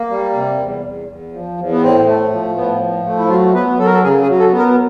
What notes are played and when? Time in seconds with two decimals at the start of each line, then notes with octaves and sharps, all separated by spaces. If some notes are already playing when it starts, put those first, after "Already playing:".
Already playing: A#3
0.10 G3
0.35 C3
0.59 E2
0.84 E2
1.08 E2
1.33 F3
1.57 E2
1.71 B3
1.82 A2 C4
2.06 A3
2.31 F3
2.56 A2 B3
2.80 F3
3.05 A3
3.17 E4
3.29 F#3 F4
3.54 B3 B4
3.78 F#3 A4
3.86 A#4
3.93 A4
4.03 C#3 G#4
4.22 G#4
4.28 F#3
4.39 A4
4.52 B3
4.58 A#4